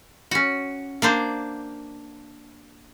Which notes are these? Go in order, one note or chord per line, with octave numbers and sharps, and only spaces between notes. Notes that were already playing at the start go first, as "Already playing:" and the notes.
C#4 F#4
A#3 D4 C5